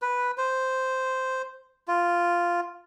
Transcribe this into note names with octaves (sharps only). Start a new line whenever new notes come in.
B4
C5
F4